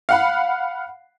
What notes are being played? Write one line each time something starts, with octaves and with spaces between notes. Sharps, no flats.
F5 F#5 B5